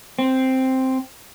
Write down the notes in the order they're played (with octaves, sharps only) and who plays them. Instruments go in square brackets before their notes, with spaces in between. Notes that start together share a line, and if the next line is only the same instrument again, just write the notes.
[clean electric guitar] C4